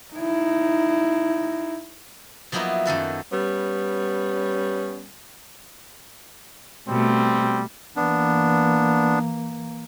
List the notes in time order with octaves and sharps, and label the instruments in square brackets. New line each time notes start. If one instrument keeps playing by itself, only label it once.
[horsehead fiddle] D#4 E4
[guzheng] F3 F#3 A#3 B3 D#4 E4
F#2 D#3 A4 B4
[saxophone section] G3 B3 C#4
[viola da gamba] B2 A3 [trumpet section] G3 C4
[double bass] E3 A#3 [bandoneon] B3 D4